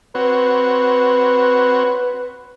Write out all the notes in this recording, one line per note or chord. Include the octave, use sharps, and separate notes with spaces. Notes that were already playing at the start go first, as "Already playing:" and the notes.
C4 F#4 B4 C#5